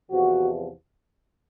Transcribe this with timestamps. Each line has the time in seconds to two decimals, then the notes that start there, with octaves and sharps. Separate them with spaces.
0.10 E2 C3 F3 F#4